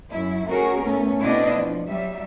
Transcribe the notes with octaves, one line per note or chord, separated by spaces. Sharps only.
F#2 E4
A3 C#4 F#4 G#4 A#4
A2 A3 B3 C#4
B2 A3 C4 D4 E4 D#5
F3
F#3 G3 E5